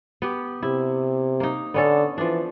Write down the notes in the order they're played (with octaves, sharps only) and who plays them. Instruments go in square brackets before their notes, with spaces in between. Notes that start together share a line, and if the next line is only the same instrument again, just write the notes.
[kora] B3 G4
[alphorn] C3 [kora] E4
[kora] A#3 D#4
[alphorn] D3 [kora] B3 C#4 A4
[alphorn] E3 [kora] F3 D4